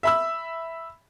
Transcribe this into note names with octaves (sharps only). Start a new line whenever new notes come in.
E5 B5 E6